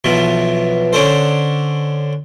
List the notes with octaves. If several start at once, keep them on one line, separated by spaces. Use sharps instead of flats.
B1 B2 E3 F3
D3 C#4 D4 A4 C5